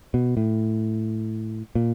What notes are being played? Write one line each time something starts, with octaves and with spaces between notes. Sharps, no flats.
B2
A2
A#2